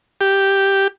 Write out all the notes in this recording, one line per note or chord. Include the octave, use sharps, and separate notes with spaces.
G4